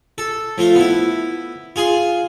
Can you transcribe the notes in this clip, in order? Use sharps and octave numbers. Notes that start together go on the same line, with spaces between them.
A4
F3 A3 F4
B3 E4
F4 G#4 C6